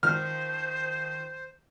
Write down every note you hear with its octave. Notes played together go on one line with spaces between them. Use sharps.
D#3 F3 C5 F6